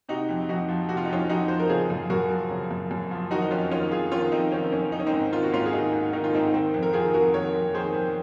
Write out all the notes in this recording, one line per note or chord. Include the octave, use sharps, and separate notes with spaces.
C3 D#4 F#4
F2
F2 D#4 F#4
F3
C3 F#4
F4
D#4
F2 C#4 F4
F2 D#4 F#4
F3 C5
A#4
C#3 F4 G#4
F#2
F#2 F#4 A#4
F3
C#3
F#2
F#2
F3
D#3 D#4 F#4
D#4
F2 C#4 F4
D#3 C#4 F4
F2 F4 G#4
D#3 C#4 F4
F4
F2 C4 D#4
D#3 C#4
F2 C#4
D#3 D#4
C#4
C4 D#4
G#2
D#3 F4
F#4
G#2 C#4 F4
G#4
D#3 D#4 F#4
G#2
D#3 D#4
F4
G#2 C4 D#4
D#3 C4
F2
A#4
D#3 F4 G#4
F2 F#4 A#4
D#3 A#4 C#5
F2
D#3 G#4 C5
F2